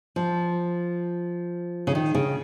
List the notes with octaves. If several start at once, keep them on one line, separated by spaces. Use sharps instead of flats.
F3
C#3
D#3
C#3